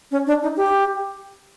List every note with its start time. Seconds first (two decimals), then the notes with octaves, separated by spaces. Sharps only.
0.11 C#4
0.27 D4
0.42 D#4
0.57 G4